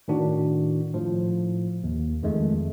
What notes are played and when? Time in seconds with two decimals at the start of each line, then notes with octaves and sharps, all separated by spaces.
0.08 A2 D#3 D4 F#4
0.94 A2 F3
1.84 D#2
2.23 F2 D#3 G#3 A3